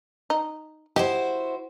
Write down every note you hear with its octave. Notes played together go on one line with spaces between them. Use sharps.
D#4
E4 F#4 G4 C5 D#5